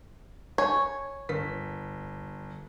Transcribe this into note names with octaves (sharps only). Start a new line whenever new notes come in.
C#5 G#5
G1 B6